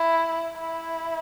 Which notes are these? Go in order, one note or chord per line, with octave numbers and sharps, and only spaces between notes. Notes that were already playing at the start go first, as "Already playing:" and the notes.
Already playing: E4
E4